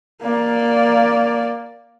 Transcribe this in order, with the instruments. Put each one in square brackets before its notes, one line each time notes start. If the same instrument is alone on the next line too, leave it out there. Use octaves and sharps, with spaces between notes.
[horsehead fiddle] A#3 D5